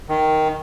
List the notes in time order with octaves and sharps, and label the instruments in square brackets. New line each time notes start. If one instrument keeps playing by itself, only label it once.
[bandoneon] D#3